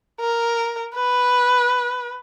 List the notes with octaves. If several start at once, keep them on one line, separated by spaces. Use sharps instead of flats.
A#4
B4